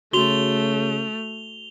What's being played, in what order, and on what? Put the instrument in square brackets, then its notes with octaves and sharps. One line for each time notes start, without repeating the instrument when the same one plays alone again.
[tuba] C#3 [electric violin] A3 [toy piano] F#4 [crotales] F7 G7